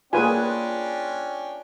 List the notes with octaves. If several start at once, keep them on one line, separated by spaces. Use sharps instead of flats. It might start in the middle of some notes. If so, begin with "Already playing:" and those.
A#3 C#4 D4 F4 G#4 B4 G5 G#5